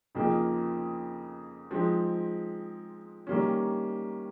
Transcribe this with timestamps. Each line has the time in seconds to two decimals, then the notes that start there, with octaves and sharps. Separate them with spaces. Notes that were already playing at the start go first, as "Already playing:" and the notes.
0.15 F2 C#3 F3 A#3 D#4
1.71 F3 G#3 C4 D#4
3.27 D#3 G3 A#3 C#4